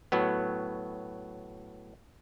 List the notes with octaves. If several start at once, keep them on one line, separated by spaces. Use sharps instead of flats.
A2 F#3 B3